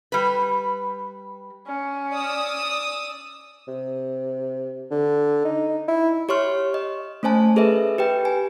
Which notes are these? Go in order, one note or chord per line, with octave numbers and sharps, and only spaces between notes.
G3 B4
C#4
D5 D#6 E6
C3
D3
D#4
E4
G4 C#5 C6 C#6 F6
D#5
A3 C#4 C5 G#5 A5
G#4 A4 B4 D#5 E5
G4 B4 G5
G#5